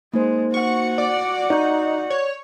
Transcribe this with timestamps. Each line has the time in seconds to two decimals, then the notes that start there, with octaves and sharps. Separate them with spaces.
0.14 G#3 A#3 D#4 C5
0.54 F#4 F#5 C#6
0.98 D5
1.50 D#4 D5 C#6 G6
2.10 C#5